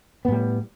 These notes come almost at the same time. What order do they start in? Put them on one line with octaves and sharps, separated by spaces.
B3 A2 G3